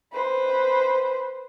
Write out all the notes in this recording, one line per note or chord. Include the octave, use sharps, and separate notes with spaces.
B4 C5